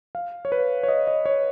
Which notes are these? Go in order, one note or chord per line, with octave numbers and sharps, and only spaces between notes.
F5
C#5
B4
C#5
D#5
D#5
C#5